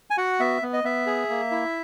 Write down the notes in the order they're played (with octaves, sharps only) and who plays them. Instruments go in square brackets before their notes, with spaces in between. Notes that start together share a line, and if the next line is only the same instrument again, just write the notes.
[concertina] G#5
F#4 F#5
B3 E5
B3
D#5
B3 E5
G#4
A#3
E4